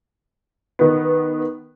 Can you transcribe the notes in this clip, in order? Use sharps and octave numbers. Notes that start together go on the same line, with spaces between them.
D#3 B3